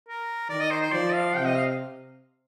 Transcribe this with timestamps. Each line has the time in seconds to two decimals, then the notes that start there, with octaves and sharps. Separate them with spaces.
0.09 A#4
0.50 D#3 D5
0.60 D#5
0.71 C5
0.82 C5
0.92 F3 D5
1.14 F5
1.35 C3 G5
1.45 D#5
1.56 F5